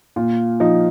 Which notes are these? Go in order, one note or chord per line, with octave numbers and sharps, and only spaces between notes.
A#2 F4
F3 D#4